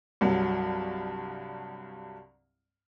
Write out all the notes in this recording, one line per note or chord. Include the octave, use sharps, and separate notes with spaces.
C2 G2 F#3